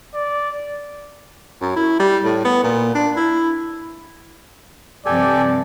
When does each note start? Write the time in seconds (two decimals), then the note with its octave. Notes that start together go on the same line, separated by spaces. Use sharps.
0.14 D5
1.61 F#2
1.76 E4
2.00 G3
2.25 A2
2.45 B3
2.64 A#2
2.95 D4
3.17 E4
5.06 G2 C3 F3 G4 A4 D5 G#5